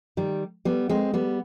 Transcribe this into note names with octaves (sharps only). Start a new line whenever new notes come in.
D#3 G3
G3 B3
G#3 C4
G3 B3